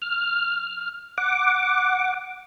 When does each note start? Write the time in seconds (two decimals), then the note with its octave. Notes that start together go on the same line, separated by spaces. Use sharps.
0.02 F6
1.18 F#5 D6